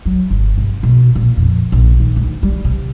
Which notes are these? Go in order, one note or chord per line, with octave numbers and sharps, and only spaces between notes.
F#3
G1
C3
B2
A#2
F2
A#1
D#3
D2
G3
C3